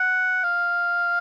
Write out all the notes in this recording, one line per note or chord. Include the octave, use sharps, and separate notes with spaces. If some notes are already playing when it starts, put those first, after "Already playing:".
Already playing: F#5
F5